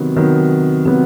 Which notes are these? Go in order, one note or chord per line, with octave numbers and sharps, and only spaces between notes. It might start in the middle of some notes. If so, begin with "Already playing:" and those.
Already playing: C3 D#3 F#3 B3
C3 D#3 F#3 B3
C3 D#3 F#3 B3